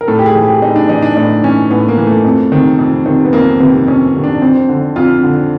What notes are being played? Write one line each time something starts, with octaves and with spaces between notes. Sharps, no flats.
A#4
A2 A4
G4
G#4
E3
G4
A2 D#4
D4
E3 D#4
D4
A2 D#4
E3 C#4
A2 B3
A#3
E3
A3
F2
C3 D#3
F2
C3 D#3
B3
F2 A#3
C3 D#3 B3
F2 C#4
C3 D#3
D4
F2 C4
D3
F2 F4
D3